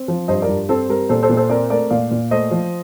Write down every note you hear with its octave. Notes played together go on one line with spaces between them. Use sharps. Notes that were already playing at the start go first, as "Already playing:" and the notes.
Already playing: C4
F3
G2 C5 D#5
A#4 D5
G2
C4 A4 C5
G3 A#4
A#2 A4 C5
A4 C5
A#2
A4 C5
C4 A#4 D5
A3 A#4 D5
A#2 D5 F5
A#2
A3 C5 D#5
F3